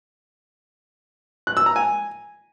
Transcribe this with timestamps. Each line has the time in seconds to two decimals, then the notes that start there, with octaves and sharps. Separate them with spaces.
1.47 F#6
1.57 E6
1.66 A#5
1.76 G#5